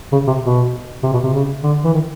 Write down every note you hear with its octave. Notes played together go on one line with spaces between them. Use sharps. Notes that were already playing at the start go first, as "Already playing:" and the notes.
C#3
C3
B2
C3
B2
C3
C#3
D3
E3
D#3